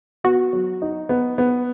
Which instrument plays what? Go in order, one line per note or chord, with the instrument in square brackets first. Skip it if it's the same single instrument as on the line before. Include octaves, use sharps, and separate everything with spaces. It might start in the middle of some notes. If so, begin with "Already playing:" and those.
[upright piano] B3 [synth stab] F#4
[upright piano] F#3
D#4
B3
B3